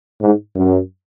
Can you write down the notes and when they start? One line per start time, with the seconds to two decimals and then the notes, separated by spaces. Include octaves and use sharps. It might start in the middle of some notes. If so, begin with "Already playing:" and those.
0.22 G#2
0.56 F#2